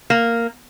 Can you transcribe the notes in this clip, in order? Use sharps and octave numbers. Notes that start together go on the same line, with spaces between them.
A#3